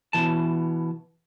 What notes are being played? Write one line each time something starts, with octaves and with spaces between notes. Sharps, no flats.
B2 E3 A5